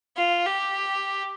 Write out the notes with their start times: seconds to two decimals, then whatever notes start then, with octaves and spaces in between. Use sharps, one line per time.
0.17 F4
0.46 G4